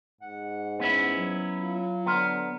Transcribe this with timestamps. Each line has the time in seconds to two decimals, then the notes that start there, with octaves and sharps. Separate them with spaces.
0.21 G#2 F#5
0.79 B3 C#4 E4
1.16 F#3
1.62 F4
2.06 D3 B3 A#5 C6 F6